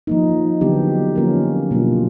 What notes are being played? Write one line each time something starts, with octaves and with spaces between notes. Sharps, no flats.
F3 A#3 D#4
D3 F#3 B3 D4 G4
F3 A#3 C#4 F4 A#4
B2 F#3 A#3 D4 F4